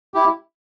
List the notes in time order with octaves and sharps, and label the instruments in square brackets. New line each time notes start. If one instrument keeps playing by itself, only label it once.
[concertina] E4 G4